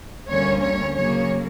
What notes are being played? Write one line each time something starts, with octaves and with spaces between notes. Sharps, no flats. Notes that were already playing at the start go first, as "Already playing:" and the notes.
D2 D3 G3 A#3 C#4 C#5
C#5
C#3 F#3 A#3 C#5